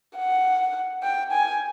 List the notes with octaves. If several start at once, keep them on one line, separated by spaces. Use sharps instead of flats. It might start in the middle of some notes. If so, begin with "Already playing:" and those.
F#5
G5
G#5